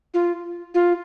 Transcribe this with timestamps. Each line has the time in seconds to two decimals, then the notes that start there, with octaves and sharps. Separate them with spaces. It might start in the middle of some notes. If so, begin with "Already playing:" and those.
0.14 F4
0.74 F4